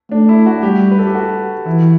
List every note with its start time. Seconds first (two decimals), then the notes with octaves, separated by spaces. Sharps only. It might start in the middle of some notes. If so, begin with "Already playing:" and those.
0.11 A3 D4
0.29 E4
0.46 F#4
0.63 G3 G4
0.91 B4
0.99 A4
1.07 G4
1.15 F#4
1.66 E3 E4